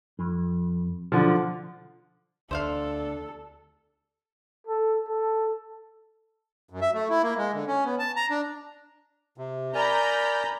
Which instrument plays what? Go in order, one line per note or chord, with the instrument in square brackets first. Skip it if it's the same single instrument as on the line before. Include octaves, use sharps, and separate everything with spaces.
[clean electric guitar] F2
[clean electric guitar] B1 [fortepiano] D3 F3
[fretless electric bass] D2 [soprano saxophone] D4 [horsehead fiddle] A4 [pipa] C5 E5 F5
[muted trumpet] A4
A4
[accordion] F#2
E5
A3
E4
A#3
G#3
D3
C#4
B3
A5
A#5
D4
[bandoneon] C3
[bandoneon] A#4 D5 G#5 [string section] A#5 B5 G6